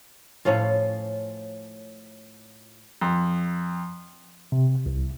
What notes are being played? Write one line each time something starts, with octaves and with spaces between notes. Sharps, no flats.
A2 F3 C#4 F4
F2
C3
C2